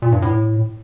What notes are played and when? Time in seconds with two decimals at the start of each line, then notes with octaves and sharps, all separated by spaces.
0.02 A#2
0.12 G2
0.22 A2